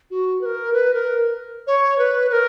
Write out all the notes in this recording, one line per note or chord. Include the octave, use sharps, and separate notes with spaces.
F#4
B4
A#4
B4
A#4
C#5
B4
B4
A#4